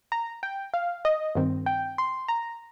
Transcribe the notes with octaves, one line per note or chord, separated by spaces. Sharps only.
A#5
G5
F5
D#5
G2 D#3 C4
G5
C6
A#5